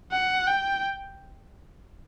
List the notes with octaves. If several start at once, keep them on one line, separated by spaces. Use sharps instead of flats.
F#5
G5